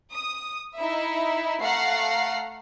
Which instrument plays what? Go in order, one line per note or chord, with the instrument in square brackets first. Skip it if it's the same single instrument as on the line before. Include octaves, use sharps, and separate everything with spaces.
[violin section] D#6
D#4 E4 E5
A3 F5 F#5 A#5 C7